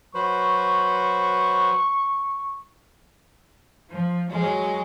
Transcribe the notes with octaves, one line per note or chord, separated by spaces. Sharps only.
F#3 B4 C5 C#6
F3
F#3 G#3 G#4